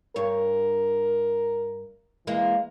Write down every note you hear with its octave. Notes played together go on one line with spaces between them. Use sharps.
G2 A#4 C#5
E3 G#3 A#3